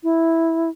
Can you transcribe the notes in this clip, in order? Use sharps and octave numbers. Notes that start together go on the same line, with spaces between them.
E4